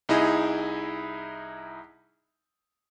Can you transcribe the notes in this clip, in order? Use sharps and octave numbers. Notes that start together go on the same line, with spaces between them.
C2 D#4 E4 G#4 D#5